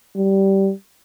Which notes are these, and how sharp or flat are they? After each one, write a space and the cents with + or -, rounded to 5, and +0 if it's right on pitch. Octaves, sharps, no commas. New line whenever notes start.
G3 -15